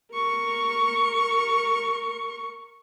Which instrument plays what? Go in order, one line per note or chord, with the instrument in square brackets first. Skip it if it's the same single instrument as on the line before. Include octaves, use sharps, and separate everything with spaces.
[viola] A#4 C#6